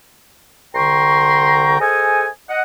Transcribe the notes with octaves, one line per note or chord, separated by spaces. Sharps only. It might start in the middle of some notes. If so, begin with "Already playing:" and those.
C2 D3 G5 A#5 C6 C#6
G#4 A4 C5 D#5 G#5
D#5 F#5